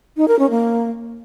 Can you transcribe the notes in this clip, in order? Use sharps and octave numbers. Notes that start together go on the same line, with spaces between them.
D#4
A#4
C#4
A#3